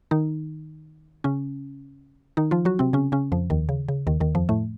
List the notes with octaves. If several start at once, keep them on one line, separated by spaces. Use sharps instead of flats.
D#3 D#4
C#3 C#4
D#3 D#4
F3 F4
F#3 F#4
C3 C4
C#3 C#4
C#3 C#4
F2 F3
D#2 D#3
C#3
C#3
D#2 D#3
D#2 D#3
F2 F3
A2 A3